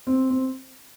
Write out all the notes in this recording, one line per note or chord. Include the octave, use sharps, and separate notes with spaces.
C4
C4